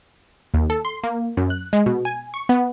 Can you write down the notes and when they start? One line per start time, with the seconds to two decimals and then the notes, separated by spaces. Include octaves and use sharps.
0.54 D#2
0.70 A4
0.85 C6
1.03 A#3
1.37 F#2
1.50 F#6
1.73 G#3
1.86 B2
2.05 G#5
2.34 C#6
2.49 B3